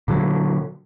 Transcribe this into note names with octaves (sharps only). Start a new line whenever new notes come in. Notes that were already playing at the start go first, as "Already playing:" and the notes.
A#2 D3 F#3